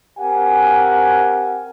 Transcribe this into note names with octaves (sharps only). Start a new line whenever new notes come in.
C4 G4 A#4 F#5 G#5